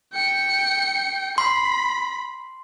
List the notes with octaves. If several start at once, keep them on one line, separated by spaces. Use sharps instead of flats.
G5 C#7
B5 C6